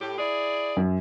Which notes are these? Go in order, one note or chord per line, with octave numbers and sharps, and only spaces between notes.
A2 G4
E4 G#4 D5
F#2